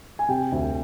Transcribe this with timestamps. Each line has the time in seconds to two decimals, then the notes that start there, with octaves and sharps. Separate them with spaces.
0.19 G#5
0.29 C3 G5
0.52 D2